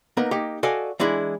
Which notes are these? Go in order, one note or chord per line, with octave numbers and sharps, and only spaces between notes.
A#3 B3 D#4 A#4
A#3 D#4 G4
F#4 A4 D5 D#5 F5 G#5
E3 G#3 D4 E4